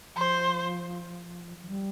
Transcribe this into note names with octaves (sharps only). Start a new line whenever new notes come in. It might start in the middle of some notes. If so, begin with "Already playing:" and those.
F3 C5
F3
G3